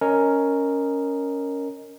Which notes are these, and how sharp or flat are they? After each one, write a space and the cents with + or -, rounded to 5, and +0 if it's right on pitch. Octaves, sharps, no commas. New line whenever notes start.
C#4 +5 A#4 +0 D#5 -5